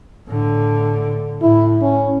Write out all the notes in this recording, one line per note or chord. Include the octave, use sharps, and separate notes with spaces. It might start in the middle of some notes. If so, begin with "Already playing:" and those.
A2 D3
A2 E4
C#4